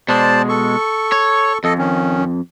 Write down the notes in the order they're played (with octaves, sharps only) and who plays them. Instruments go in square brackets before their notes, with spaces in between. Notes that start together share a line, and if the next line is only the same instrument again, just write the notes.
[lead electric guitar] B2 G#3 [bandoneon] C5 D5 A5
[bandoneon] A4 C#6
[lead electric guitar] C#5
[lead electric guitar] F2 [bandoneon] A4 D#5
[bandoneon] D#3 C#4